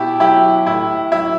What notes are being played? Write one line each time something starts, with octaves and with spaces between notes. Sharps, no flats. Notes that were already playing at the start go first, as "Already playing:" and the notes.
Already playing: B2 E4 G4
F#3 E4 G4
A2 E4
F#3 E4